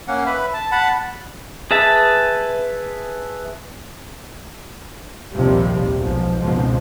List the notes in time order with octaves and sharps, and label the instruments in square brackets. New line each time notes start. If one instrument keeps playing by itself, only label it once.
[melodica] A#3 C#4 F#5
B4 E5 B5
A5
F#5 A5 B5
[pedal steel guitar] G#4 B4 E5 A5
[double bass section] A#1 D#2 C3 F3 G3
B1 G#2 B2 F3
G#1 C#2 G#2 B2 F3